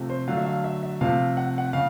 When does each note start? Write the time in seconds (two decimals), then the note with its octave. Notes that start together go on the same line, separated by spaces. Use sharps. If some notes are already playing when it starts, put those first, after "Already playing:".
Already playing: C3 F3 A3
0.10 C5
0.28 D3 F#3 A3 F5
0.37 E5
0.46 F5
0.64 E5
0.83 E5
1.01 C3 F3 A3 F5
1.37 F#5
1.58 F#5
1.73 C#3 F5